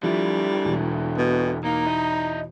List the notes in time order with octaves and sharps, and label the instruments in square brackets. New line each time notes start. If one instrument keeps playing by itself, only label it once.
[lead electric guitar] D3 E4 [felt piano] F3 [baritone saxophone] G3
[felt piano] E1
[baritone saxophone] B2
[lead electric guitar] A#3 [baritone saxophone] D#4
[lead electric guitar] E4 D#5